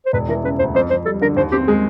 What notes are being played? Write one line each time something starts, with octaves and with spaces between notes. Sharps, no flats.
C5
E1 B4
E3 A#4
C#3 B4
D2 C5
F2 C5
F2 C5
G3 A4
D3 A#4
D#2 C5
C4 G4
G#3 G#4